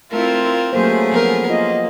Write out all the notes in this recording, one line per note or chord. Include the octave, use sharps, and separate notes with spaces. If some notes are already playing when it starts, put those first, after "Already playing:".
A3 C4 E4 F4 A#4
E4
F#3 A3 A#3 C#4 G#4 C5
F3 B3 A#4
A#3 F4 D#5